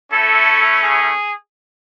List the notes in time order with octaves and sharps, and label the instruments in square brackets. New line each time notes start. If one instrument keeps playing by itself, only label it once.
[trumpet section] A3 C#4 E4 A4
G#4